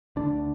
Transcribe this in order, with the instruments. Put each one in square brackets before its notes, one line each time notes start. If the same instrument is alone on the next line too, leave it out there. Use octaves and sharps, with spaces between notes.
[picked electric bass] D2 D3 D4